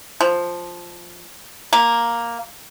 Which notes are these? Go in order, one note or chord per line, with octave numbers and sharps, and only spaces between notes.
F3
A#3